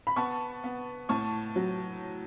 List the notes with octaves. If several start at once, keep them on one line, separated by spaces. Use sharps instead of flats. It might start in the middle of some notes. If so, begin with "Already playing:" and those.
B5
B3 A5 C#6
B3
A2 A5 C#6
F#3